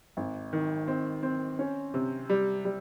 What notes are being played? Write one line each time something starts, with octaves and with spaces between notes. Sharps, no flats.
G#1
D#3
C4
C4
C#4
C3
G3
G3